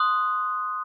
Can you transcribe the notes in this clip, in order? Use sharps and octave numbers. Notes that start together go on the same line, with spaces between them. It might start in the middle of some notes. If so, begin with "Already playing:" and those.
Already playing: C6 D#6 F#6